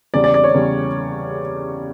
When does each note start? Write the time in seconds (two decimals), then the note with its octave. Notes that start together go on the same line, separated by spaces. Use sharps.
0.14 E2 C#3 G3 D5
0.24 D5
0.34 D5
0.44 C#5
0.54 E2 C#3 G3